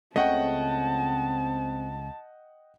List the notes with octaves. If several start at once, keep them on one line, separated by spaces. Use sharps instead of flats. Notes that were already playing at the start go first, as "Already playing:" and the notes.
C#2 C#3 A3 C4 D#5 F#5 G5 A5